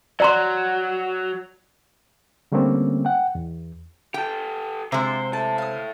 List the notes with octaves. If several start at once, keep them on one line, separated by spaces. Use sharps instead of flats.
F#3 D5 A#5 C6
D3 G3 A3 A#3 C4 C#4
F#5 G5
E2
G4 A4 G5
C3 G#3 F4 C5 E5
E4 A4 A5
F5 D#6